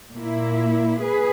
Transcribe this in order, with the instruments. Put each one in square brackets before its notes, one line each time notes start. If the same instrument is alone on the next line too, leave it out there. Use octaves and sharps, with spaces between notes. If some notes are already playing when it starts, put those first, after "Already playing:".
[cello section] A#2 A#3 E4
G#4 B4